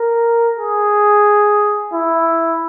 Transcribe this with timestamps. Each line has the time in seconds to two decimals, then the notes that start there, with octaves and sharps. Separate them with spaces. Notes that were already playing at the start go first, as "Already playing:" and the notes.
Already playing: A#4
0.57 G#4
1.94 E4